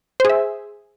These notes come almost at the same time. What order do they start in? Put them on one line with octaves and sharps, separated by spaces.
C5 G#4 E5